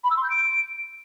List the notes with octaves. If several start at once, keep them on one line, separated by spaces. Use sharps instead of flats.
B5
E6
C6
G6
D7